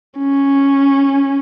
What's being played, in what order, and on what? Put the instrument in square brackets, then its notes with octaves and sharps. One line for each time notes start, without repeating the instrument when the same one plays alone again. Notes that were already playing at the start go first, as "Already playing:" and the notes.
[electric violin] C#4